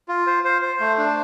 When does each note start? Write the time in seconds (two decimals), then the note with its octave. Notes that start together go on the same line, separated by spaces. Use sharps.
0.08 F4
0.27 C5
0.45 C5
0.62 C5
0.80 A3
0.98 D4